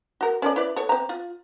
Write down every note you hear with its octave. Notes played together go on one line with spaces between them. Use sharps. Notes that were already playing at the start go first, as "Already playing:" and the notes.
F#4 A#4
C#4 A4 D5
E4 B4 D5
A4 C#5
C4 A#5
F4